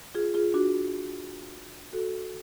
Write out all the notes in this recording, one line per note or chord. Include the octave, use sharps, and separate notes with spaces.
F4 G#4
F4 G#4
D4 F#4
F#4 A4